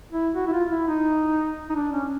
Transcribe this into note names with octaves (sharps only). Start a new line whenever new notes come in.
E4
F#4
E4
F4
E4
D#4
D#4
D4
C#4